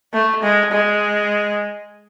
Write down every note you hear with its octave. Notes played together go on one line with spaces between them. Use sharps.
A3
G#3
G#3